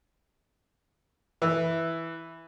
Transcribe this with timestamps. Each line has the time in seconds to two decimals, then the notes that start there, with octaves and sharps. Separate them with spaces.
1.42 E3